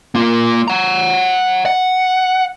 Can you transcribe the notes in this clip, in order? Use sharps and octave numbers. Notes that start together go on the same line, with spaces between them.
A#3 F4
F#5 A#5
F#5